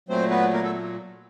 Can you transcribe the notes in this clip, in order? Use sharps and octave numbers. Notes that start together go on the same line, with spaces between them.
A#2 F#3 A3 C4 C5
B3 B4
A#3 A#4
A3 A4